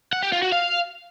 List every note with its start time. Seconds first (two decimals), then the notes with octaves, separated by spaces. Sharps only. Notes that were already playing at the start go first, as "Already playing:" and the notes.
0.13 F#5
0.23 G4
0.32 F4
0.42 F#4
0.52 F5